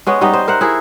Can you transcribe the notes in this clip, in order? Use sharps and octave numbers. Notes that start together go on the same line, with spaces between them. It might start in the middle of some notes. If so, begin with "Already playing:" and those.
G#3 B3 C#4
G3 B3 D#4 D#5
C5
A#4 C5 E5 F#5
E4 G#4 A#4